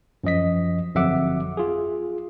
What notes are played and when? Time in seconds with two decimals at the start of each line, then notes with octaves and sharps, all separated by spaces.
0.24 F#2 F3 D#5 B6
0.95 G1 F2 F#3 E5 F#5 D6
1.57 F4 G#4